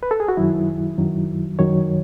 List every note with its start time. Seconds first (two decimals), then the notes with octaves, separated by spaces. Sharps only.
0.03 B4
0.11 A4
0.20 G#4
0.28 F#4
0.37 F#2 D#3 F#3 E4
0.98 F#2 D#3 F#3
1.59 F#2 D#3 F#3 C#5